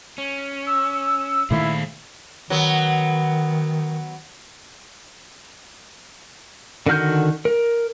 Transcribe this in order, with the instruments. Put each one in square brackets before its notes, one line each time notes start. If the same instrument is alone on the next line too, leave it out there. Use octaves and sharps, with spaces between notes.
[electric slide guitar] C#4
[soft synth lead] E6
[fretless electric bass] A#2 D#3 A3 [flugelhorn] E4 [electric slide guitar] G#4 C5 F5
[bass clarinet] D#3 [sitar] F#3 B3
[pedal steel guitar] D3 D#3 F#4 F6 G6
A#4